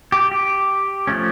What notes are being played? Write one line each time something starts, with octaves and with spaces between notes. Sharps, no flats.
G4
G4
F3 A3 C#4